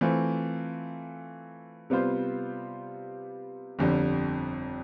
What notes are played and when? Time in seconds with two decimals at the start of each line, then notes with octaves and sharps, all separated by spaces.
0.01 E3 A3 C4 F4
1.90 C3 G3 B3 F4 C5
3.79 G1 F2 D3 G3